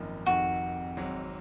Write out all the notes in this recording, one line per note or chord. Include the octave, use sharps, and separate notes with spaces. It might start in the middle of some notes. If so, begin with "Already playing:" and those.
Already playing: G#1 F#2 F3 A#3 D#4
F1 F2 D#3 F#4
G#1 G#2 F#3 C4